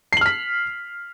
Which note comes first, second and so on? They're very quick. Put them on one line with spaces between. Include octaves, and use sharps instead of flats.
C7 F#7 F6 B6